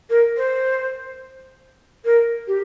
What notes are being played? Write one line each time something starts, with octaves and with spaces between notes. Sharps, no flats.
A#4
C5
A#4
G4